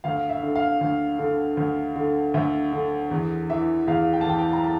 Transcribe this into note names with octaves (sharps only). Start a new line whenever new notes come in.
D2 F5
E5
D3
F5
D2
D3
D2
D3
D2 E5
D3
E2
E3 E5
E2 F5
G5
A5
E3 G5
G5
A#5
A5